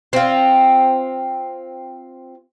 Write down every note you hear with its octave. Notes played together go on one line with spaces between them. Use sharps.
C4 F4